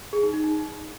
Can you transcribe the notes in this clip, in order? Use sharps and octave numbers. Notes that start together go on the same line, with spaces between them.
G#4
D#4
D#4
D#4